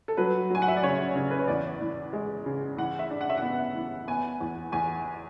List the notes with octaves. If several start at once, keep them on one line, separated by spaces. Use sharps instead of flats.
A4
F#3 B4
F#3 G#5
F#5
E5
D5
C#3 C#5
C#3
B4
C#5
E2 D5
E3
G#3
C#3
E3 F#5
E5
D4
F#5
E5
B3 F#5
E3
B3 G#5
E2
E2 G#5